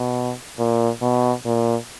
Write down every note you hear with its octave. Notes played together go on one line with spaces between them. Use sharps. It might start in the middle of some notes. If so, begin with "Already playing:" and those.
Already playing: B2
A#2
B2
A#2